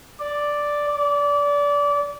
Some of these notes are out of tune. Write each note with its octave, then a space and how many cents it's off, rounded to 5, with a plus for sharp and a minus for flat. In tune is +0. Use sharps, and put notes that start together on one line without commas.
D5 +0
D5 -25